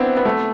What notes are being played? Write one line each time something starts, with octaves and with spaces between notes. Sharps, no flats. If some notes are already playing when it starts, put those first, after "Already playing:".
Already playing: B3 C4 D4 E4
B3
A3